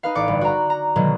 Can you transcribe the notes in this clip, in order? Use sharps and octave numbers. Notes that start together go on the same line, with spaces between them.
D#4 B4 F5
A1 D5 D6 C#7
G1
F#4 A#5
A#5
B2 D3 D#3 F#3 G#3 A#3